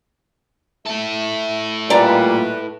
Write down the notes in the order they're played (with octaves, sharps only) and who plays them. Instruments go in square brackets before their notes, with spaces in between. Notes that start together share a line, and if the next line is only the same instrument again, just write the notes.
[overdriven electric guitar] E4 A4 [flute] E5
[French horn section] A#2 G3 F4 [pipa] G#3 D5 A#5 [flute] B4